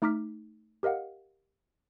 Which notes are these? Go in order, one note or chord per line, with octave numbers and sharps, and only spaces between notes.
A3 D#4 A#5 D6 F6 B6
G4 A#4 D#5 F5 F#5